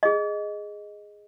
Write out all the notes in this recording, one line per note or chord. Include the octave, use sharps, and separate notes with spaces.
G#4 D#5